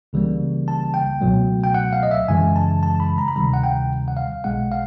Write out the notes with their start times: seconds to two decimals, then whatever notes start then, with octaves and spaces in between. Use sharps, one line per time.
0.13 C#2 C#3 E3 G3 A#3
0.68 A5
0.94 G5
1.21 C#2 B2 F#3 A3
1.64 G5
1.74 F#5
1.93 F5
2.03 D#5
2.11 E5
2.28 F#2 C#3 E3 G#3 G#5
2.56 A5
2.83 A5
3.00 B5
3.18 A#5
3.28 B5
3.36 D2 C3 D#3 G3 A#5
3.53 F#5
3.63 G5
4.08 F#5
4.17 F5
4.44 B1 B2 G#3 F#5
4.72 F5